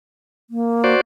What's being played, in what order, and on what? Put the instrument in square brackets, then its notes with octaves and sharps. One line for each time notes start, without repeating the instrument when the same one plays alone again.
[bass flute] A#3
[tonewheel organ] F#4 C5 D5